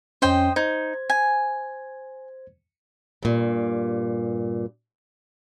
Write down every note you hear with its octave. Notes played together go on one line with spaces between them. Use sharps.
F2 C#4 C5 D#5 G5
D#4 C5 G#6
G#5
G2 A#2